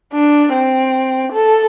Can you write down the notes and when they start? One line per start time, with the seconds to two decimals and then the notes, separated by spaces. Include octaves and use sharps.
0.13 D4
0.53 C4
1.33 A4